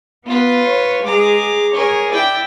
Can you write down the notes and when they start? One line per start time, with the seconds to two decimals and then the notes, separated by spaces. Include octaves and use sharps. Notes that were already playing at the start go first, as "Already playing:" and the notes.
0.26 B3 F4 B4
0.64 C#5
1.05 G#3 G#4 A#5 D6
1.74 G#4 A#4 C#5
2.11 E4 D5 G5